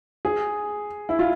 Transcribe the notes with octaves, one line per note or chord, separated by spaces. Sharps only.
G#4
E4
F4